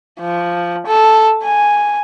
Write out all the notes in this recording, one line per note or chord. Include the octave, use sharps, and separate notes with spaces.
F3
A4
G#5